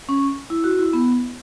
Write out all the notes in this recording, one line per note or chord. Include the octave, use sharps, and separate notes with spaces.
C#4
E4
F#4
E4
B3